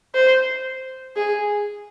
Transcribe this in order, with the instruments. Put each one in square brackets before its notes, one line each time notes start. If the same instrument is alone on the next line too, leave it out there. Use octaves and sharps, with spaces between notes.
[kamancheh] C5
G#4